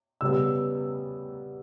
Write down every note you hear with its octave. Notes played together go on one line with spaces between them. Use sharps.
C#3 G3 B3 E6